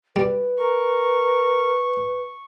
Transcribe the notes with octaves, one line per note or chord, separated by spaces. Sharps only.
G3 B4
A#4 C#6